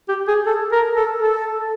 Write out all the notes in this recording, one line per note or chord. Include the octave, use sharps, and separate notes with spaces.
G4
G#4
A4
A#4
A4
A4